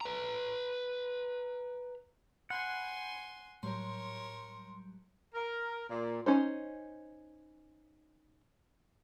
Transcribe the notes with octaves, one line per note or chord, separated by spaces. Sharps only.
B4 A#5
F#5 G#5 B5 C6 G6 G#6
A2 F#3 G3 A#4 C#5 C6
A#4
A#2
C#4 D#4 C5